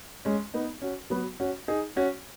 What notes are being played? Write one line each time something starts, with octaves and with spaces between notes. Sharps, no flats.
G#3 C#4
B3 D#4
C#4 F#4
F#3 B3
C#4 F#4
D#4 G#4
C#4 F#4